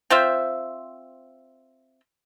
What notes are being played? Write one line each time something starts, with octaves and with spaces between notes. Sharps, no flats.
C4 F4 C5 E5